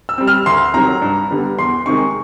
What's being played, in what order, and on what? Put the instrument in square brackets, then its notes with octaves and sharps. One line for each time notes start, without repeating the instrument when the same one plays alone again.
[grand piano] E6
G3 C4
F6
D2 C6
C3 D#3 F#3 A#5
G2
D3 G3 B3
E2 C6
C3 D#3 G#3 C#6